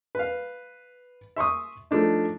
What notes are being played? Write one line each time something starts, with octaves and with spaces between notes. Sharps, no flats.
B4 F5
E5 C6 C#6 D#6
F3 A3 D4 D#4